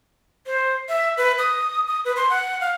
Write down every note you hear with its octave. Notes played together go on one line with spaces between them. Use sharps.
C5
E5
B4
D#6
D#6
B4
C6
F#5
F5